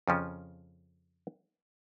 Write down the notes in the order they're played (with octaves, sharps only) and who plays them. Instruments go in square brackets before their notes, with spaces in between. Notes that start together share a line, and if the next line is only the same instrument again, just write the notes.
[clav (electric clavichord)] F2 C#3 F3 C#4